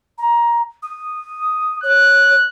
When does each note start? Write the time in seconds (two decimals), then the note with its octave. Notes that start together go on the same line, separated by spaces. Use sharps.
0.18 A#5
0.82 D#6
1.83 C#5 F#6